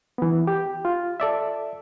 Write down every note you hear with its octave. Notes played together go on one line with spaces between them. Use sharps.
E3 B3
G4
F4
A4 D5 E5